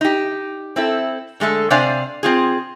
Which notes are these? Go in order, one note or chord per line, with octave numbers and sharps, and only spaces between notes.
D#4 G4
C4 E4 A4
D3 G#3 A3 A4
C3 D4 C5 D5 F5 G#5
C4 F4 G#4